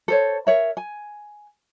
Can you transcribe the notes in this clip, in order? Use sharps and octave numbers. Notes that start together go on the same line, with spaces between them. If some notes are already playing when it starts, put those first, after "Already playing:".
A4 C5 C#5
A#4 C#5 E5
G#5